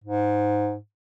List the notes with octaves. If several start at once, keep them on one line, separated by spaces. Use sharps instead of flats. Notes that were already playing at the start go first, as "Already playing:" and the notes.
G#2